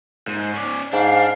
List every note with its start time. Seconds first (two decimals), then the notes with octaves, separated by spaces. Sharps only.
0.28 G#2
0.54 C#4 D5
0.93 G#2 D4 F5